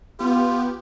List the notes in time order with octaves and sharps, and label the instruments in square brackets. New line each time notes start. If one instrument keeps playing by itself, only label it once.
[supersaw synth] B3 G4 [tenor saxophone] F4